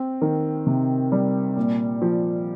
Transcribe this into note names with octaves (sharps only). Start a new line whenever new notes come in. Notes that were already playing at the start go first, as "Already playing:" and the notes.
Already playing: C4
D#3
C3
G3
A#2
F3